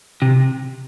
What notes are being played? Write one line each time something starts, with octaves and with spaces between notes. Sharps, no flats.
C3